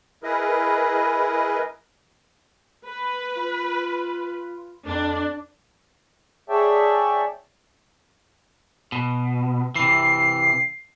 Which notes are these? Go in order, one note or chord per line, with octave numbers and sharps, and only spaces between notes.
E4 G#4 A#4 B4 D#5
B4
F4
F2 D4
G#4 C#5 D5 E5 G5 A5
B2
C3 E3 C7